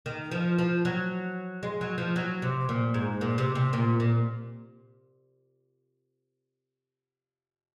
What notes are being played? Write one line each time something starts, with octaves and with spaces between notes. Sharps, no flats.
D#3
F3
F3
F#3
G#3
F#3
F3
F#3
C3
A#2
G#2
A#2
C3
C3
A#2
A#2